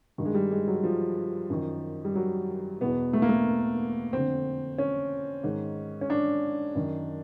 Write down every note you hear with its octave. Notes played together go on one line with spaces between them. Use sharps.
G2 D#3
G#3
G3
G#3
F#3
F3
F#2 D#3
G3
F#3
E2 B2 B3
A3
A#3
A3
F2 D3 C4
C#4
G#2 D#3
C#4
D4
F#2 D#3